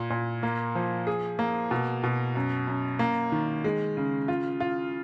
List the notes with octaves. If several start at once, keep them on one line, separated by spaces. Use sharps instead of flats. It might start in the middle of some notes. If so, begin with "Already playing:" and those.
Already playing: A#2
A#2
A#3
F3
G#4
A#3
B2
B2
F#2
F#2
A#3
D#3
G#3
C#3
F4
F4